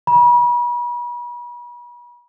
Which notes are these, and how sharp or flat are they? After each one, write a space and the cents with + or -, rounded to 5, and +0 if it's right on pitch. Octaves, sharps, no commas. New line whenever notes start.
B5 -40